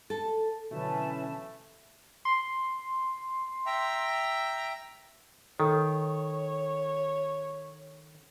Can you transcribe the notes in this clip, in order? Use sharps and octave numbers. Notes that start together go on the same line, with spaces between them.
A4
B2 D3 E3 F#3 A3 C#4 B4 A5
C6
E5 G5 A#5
D#3 A4 C#5